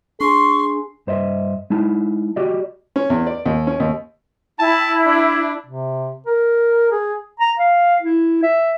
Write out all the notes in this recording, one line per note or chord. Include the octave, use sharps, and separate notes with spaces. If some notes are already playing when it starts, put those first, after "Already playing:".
D4 G#4 C6 C#6
G2 C5 D#5 E5
G#3 D#4 E4 A5
F#4 G4 D5 D#5
C#4
E2
D5
D#2
C#4
D#2
E4 A5
D4
C3
A#4
G#4
A#5
F5
E4
E5